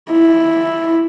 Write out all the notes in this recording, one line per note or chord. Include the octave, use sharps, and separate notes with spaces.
E4